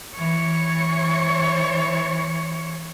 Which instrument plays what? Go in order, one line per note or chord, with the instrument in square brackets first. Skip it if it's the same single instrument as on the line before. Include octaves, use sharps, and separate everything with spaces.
[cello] E3 C#5